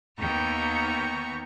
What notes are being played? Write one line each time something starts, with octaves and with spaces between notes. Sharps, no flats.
D#2 D#3 B3 G5 A#5 C#6